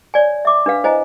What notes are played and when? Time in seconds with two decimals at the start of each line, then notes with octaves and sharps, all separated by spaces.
0.14 C#5 D5 G#5
0.45 E5 D6
0.66 D4 B4 F5
0.84 E4 C5 D#5 G#5 A#5